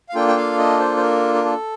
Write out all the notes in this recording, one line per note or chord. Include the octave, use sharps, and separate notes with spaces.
F5
A#3 D4 F4 A4 G5
G5
F5
D#5
C5
C5
A#4
A#4
A4